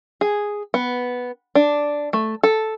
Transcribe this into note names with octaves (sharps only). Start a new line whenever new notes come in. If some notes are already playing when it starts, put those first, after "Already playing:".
G#4
B3
D4
A3
A4